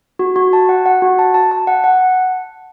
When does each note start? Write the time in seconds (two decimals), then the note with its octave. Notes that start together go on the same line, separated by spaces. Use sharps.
0.19 F#4
0.36 F#4
0.53 A5
0.69 F#5
0.86 F#5
1.02 F#4
1.19 A5
1.34 A5
1.51 A5
1.67 F#5
1.84 F#5